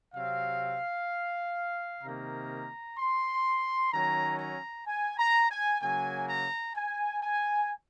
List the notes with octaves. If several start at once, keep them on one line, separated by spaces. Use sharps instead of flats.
C3 F#3 C4 F5
C3 D#3 A#3 A#5
C6
D#3 F#3 C#4 A#5
A#5
G#5
A#5
G#5
C#3 F#3 A#3 G#5
A#5
G#5
G#5